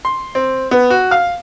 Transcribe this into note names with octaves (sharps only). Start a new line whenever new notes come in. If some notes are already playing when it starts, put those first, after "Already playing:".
C6
C4
B3
F#4
F5